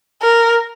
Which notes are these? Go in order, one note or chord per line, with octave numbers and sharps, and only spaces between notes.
A#4